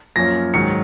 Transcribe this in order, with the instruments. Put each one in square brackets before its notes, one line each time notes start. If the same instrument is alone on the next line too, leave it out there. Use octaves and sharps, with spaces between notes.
[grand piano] F#2 F3 A#3 C#4 A#6
G#2 D#3 F#3 C#7